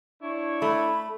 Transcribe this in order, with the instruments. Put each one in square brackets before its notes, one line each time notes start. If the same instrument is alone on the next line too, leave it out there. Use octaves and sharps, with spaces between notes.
[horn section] D4 E4 C#5
[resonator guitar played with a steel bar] A3 [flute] B5